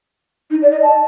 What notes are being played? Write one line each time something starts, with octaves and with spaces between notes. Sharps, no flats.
D#4
D5
D#5
A5